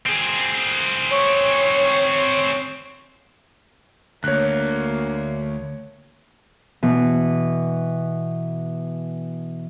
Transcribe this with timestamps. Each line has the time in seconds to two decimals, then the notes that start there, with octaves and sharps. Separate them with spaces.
0.06 C4 G#4
1.11 C#5
4.24 D2 A#3 C#5 F#6
6.83 B2 E3